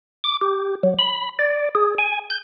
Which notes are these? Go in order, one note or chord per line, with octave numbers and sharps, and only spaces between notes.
D6
G4
F#3
B5
D5
G#4
G#5
G6